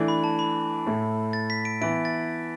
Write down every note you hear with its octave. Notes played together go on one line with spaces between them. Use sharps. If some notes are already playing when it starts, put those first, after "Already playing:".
Already playing: E3 A3 D4
B5
A5
B5
A2 A3 E4
A6
B6
D7
E3 B3 E4 D7
A6